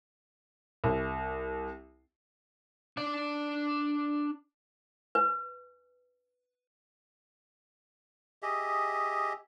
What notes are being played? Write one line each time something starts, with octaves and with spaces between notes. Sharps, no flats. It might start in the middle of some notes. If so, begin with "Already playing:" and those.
C2
D4 D5
B4
G4 G#4 D#5 E5